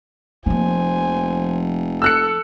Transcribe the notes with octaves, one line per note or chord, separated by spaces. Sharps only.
F1 F3 A#3 C5 G#5
A4 E6 F#6 C#7